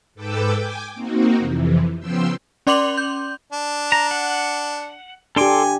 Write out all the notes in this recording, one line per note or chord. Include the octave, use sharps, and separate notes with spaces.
G#2 A4 B4 G5 D6 E6
G5 G#5 D6
A#3 C4 D#4 F#4
F2 C3 E3
C#3 F3 B3 G5 C6 E6
C#4 D5 C6 D6 F7 F#7
G6
D4
A#5
F#5
D4 G4 A4 G#5 C6 D6